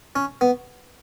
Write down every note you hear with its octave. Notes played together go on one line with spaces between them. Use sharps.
C#4
B3